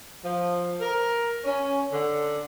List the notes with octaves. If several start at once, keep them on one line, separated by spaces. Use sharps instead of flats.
F3
A#4
C#4
D3